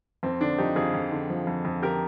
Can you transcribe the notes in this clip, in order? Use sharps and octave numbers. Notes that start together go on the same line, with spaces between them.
F2 C4
D3 D4
F3 D#4 G4
F2 F4 G#4
F2
D3
F3
F2
F2
D3 G4 A#4